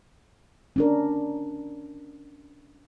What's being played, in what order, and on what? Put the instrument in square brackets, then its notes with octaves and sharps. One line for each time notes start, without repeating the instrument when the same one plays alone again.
[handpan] C#4 D4 A#4